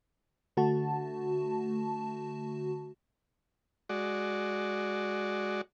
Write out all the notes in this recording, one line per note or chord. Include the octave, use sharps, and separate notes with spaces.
D3 A3 F#4 A5
G#3 F#4 D5